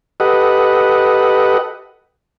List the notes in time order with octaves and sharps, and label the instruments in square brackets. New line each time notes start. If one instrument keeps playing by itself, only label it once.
[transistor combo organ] G4 A4 B4 D#5 F#5